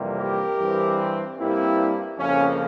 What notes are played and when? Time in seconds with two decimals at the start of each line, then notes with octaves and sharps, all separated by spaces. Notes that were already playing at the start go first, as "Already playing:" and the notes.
Already playing: F2 C3 E3 G3 A#3
0.19 G4 A#4
0.59 G2 E3 G3 C4
1.38 G2 G3 A#3 C4 E4
2.18 F2 C#3 F3 A#3 C#4